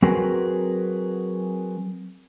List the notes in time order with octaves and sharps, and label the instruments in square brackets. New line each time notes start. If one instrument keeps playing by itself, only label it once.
[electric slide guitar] F#3 C4 F#4 G#4 A#4 B4